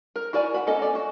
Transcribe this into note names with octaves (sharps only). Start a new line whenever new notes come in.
A#4
E4 F#4 A#4 D5 G#5
F#5 B5
A#3 C#4 A4 D#5
C#4 D5
F#4